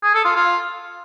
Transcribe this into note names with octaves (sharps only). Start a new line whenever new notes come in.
G#4
A4
F4
F4